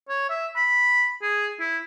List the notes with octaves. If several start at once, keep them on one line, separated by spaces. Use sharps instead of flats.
C#5
E5
B5
G#4
E4